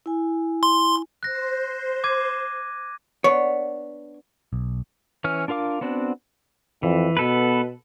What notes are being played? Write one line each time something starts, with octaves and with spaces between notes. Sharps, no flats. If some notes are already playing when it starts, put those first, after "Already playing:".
E4 G#5
C6
C5 F#6 A#6
D6 G#6 D#7
B3 D4 C#5
B1
E3 C#4 F6
D4 F4 A#4 F5 D6
B3 C4 D4 F#4
F2 E3
B2 B3 A4 B4